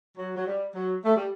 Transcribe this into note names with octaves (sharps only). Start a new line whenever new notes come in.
F#3
F#3
G3
F#3
A3
G3